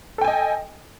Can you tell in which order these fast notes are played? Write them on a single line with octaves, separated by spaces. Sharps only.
A4 G5 G#5 D#5